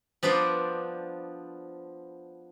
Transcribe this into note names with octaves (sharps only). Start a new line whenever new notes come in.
F3 B3 D4 B4 C5 D5